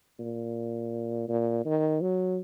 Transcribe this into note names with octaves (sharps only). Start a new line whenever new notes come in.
A#2
A#2
D#3
F#3